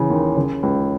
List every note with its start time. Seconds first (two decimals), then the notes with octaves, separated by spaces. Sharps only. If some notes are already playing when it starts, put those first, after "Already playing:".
Already playing: C#3 E3
0.10 D#2
0.37 C#3
0.63 C#2